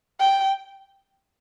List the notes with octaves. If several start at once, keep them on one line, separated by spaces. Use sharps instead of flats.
G5